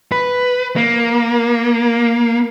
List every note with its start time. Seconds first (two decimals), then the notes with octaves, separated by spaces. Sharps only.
0.12 B4
0.76 A#3